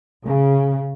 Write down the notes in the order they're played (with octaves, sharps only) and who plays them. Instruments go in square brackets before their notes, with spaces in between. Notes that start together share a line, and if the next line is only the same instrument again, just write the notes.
[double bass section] C#3